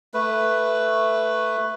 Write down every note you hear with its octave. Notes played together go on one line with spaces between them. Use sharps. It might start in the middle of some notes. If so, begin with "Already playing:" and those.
A3 B4